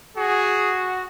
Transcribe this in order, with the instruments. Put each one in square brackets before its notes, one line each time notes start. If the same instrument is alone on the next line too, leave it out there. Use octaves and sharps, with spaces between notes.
[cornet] F#4 [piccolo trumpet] G#4